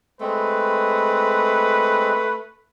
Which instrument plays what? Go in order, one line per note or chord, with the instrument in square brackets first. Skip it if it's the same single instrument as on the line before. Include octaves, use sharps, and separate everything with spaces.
[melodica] G#3 C4 [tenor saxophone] A3 [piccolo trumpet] B4